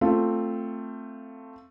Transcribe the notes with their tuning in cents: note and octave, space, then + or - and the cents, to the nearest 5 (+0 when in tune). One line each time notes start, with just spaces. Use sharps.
A3 +10 C4 +0 F4 +0